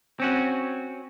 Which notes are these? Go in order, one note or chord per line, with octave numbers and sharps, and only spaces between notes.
C4 C#4 F#4